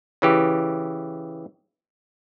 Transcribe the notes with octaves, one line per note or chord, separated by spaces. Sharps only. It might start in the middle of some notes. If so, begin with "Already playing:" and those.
C#3 E3 G4